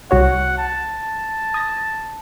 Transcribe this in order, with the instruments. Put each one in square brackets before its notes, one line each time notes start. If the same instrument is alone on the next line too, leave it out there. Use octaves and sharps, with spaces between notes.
[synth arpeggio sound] C2 F#4 C#5 [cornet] F#5
[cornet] A5
[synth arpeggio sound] D#6 G#6 A#6